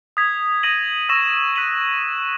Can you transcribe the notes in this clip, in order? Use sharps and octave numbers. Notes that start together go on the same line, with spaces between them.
D#6 G#6 B6
D#6 A#6 D#7 F#7
C#6 E6 A#6 E7
F#6 B6 D#7 F#7